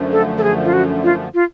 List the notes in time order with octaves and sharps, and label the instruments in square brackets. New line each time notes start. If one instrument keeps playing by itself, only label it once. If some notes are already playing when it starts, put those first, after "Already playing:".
Already playing: [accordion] F#2 D3 F3 A3
[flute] A4
A4
G#4
F4
F#4
F4
F4